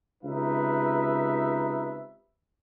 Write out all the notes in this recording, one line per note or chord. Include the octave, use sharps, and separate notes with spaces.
C#2 C3 D#4 B4 E5